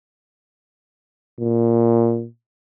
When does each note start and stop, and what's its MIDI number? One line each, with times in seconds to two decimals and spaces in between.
1.39 2.26 46